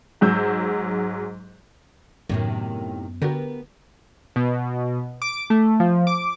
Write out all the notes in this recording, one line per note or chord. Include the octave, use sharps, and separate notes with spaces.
G#2 F#3 E6 G6
F#2 A2 C3 D#3 B3
D3 B3 F#4 G4 A#4
B2
D6
A3
F3
D6